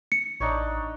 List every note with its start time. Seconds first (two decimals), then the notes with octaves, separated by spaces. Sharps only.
0.12 C#7
0.40 A1 D4 D#4 C#5